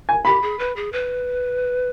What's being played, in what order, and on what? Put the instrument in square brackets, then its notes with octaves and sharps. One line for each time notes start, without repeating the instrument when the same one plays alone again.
[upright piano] G#5
[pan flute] G4 [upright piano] B5
[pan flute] G#4
B4
G#4
B4